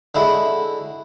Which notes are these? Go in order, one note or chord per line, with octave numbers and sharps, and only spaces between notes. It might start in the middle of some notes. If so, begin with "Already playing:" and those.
D3 G#3 E4 F#4